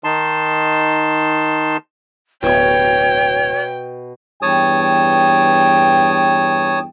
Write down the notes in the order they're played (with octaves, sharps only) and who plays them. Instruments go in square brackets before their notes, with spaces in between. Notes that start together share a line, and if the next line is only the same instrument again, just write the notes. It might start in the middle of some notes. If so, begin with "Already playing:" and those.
[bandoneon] D#3 D#4 A5 C6
[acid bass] D1 [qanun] B2 E5 [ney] C#5 [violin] G5
[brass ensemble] E2 G2 G5 [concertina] C#5 A5 D#6